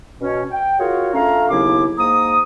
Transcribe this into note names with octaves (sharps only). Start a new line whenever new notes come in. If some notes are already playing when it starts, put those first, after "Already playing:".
B2 C#4
G5
F4 F#4 G#4 A#4 C#5 F#5
A3 C#4 D4 F4 F5 A#5
D#2 C#3 F#3 B3 E4 D6
G#2 A#3 A#5 D#6